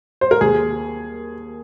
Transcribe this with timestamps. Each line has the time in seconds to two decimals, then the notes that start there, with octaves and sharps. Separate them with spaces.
0.21 C5
0.31 A#4
0.41 D#2 G#4